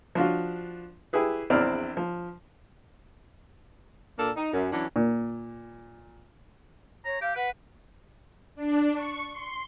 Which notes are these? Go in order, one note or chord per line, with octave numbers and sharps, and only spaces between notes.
F3 D4 F4 F#4
E4 G4 G#4 B4
A#1 E2 C4 E4 D5 F6
F3
A#2 A#3 D4 A4
D#4
F#2
E3 F#3 C#4 D4
A#2
C#5 A#5
G4 F5
B4 F#5
D4
C#6
C6